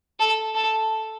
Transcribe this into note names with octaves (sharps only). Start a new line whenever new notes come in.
A4
A4